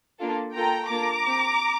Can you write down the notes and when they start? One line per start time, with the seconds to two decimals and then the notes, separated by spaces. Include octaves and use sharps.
0.20 A#3 D4 F4 A4
0.55 A#3 F4 A4 G5 A#5
0.90 A#3 D4 F4 A4 A#5 D6
1.26 C4 G4